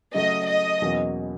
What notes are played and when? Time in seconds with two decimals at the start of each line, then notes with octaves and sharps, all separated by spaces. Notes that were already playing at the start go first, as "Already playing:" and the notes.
0.14 C#3 F#3 A3 D#5
0.48 D#5
0.82 E2 B2 F#3 A#3 C#4